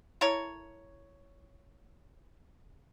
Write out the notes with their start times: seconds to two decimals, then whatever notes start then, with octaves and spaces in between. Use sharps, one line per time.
0.21 E4 A4 A#4 C#5